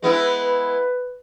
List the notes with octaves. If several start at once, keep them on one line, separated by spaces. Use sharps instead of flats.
G#3 B3 E4 B4